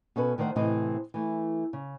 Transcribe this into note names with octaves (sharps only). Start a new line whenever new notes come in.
B2 C#4 A4 B4
D3 D#3 A3 C5 F#5
A2 C3 E3 C4 D#5
E3 A3
C#3